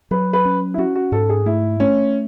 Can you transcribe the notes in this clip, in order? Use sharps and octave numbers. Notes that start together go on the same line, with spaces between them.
F#3 B4
B4
C#4
E4
C#4 F#4
F#4
G#2 A4
G#4
A3 E4
A3 C#4